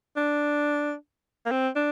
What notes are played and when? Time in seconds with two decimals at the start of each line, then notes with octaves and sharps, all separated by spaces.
0.16 D4
1.46 A#3
1.51 C4
1.76 D4